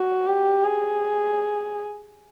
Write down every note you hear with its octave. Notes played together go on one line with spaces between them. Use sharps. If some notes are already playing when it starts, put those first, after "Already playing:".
Already playing: F#4
G4
G#4